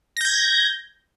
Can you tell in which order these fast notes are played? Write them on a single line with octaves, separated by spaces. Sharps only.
A#6 G6 G#6